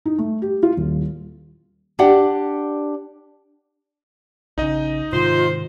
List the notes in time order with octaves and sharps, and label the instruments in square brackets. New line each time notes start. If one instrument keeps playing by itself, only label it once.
[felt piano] D#4
A3
G4
F4
D#1
[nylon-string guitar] D4 G4 D5 F#5 G5
[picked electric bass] A#1 C#3 [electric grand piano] D#4 D#5
[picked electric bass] G#2 C3 D#3 [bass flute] F4 [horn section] C5